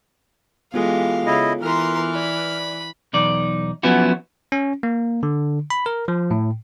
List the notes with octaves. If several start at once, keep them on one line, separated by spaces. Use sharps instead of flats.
E3 G#3 B3 F4 G4 A4 F5
C#3 E4 D#5
E3 A#4 B4 C6 F6
D5 B5
B1 E2 D#4 D5
F3 F#3 B3 C#4 E4 F#4
C#4
A#3
D3
B5
A#4
F3
A2